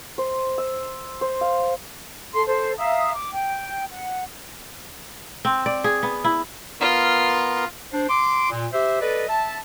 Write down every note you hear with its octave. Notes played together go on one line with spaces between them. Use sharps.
C5
E6
C5
F5
A4 C6
A4 C5
E5 F5 A#5 D#6
D6
G5
F#5
C4
D5
G#4
B3
E4
B3 F4 A#4 C6
D4 C5
C6 D6
A#2
G4 C5 E5
A4 B4 D5 D#5
E5 A5